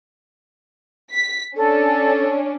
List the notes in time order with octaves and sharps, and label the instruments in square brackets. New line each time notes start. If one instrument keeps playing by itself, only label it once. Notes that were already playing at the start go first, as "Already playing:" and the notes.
[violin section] B6
[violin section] C#4 D4 [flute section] A4